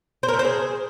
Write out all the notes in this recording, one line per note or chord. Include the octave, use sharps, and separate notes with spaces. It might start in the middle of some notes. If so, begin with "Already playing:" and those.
C5
A#4
A3
C5
G#4